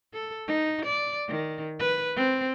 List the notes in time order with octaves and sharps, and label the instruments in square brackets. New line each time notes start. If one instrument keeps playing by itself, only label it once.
[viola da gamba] A4
D#4
D5
D#3
B4
C4